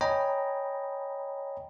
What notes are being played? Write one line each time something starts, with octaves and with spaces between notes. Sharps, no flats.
C#5 D#5 G5 G#5 A#5 B5